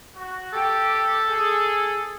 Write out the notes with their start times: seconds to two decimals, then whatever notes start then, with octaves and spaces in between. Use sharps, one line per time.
0.16 F#4
0.53 G4 A4
1.29 G#4